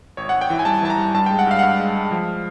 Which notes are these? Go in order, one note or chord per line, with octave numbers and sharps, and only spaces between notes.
G#1 C#5
G#1 F#5
G5
E3
G#5
G3 A5
E3 A5
A#5
G3
G2 A5
G5
G#3
F#5
G2 F5
F#5
G2 F5
G#3
G#3
F3